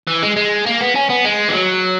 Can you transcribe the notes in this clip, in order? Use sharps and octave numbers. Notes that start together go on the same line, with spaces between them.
E3
G#3
G#3
A#3
B3
C#4
B3
G#3
E3
F#3